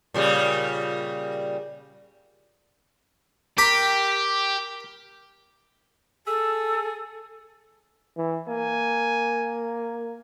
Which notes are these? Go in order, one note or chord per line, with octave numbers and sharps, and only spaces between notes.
A#2 C#3 G3
G4 A#4 B5 D6
G#4 A4 E6
E3
A#3 G#5